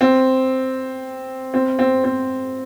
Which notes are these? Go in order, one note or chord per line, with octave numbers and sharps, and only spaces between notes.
C4
C4
C4
C4